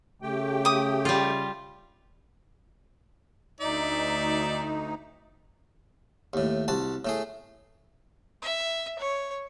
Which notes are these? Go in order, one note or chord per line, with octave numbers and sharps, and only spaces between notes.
C#3 A3 G4 G5
D6 D#6
G3 F4
D2 D#4 D5 E5
D#2 A2
C2 F#4 A5
A2 A3 G#4
E5
C#5